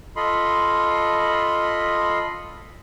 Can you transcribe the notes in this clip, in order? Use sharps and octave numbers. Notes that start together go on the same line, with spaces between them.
F4 A4 D#5 B5 C6